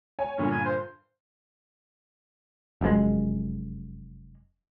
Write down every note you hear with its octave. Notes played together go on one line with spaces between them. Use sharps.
C#5 G#5
G2 A#2 D3 C#4
G#5
C5
F1 F#2 A2 G#3